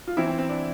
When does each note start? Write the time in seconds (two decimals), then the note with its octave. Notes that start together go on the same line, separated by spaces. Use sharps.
0.08 F4
0.17 E2 E3 C4 E4
0.28 C4
0.38 C4
0.49 D4